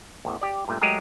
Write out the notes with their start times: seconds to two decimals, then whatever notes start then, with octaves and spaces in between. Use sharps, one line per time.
0.25 A1 E2
0.41 G4 D5
0.68 G2 A#2 A3
0.81 F#3 G#3 A3 G4 G#4 A#4